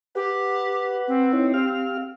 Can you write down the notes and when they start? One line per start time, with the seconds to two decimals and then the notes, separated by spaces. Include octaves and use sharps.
0.15 G4 B4 F#5
1.08 C4
1.33 D#4 E4 C#5
1.54 G4 F5 F6